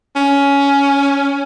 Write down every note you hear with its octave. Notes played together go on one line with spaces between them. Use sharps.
C#4